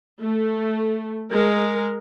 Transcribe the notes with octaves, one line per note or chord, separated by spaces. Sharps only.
A3
G#3 A#4